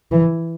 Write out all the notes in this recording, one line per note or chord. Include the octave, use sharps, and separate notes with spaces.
E3